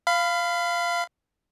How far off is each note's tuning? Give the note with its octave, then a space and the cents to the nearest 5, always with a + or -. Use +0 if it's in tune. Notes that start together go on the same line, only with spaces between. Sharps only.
F5 -10 B5 +25